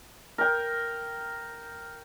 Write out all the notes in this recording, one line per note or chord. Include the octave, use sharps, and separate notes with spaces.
A#4 G5